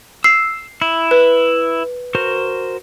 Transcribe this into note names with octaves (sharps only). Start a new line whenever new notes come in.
E6 C7
E4
B4
F#4 A#4 C5